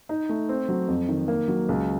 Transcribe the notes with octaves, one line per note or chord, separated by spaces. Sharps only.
D#4
A3
C4
F#3
F2
D#3
A#3
F#3
C#2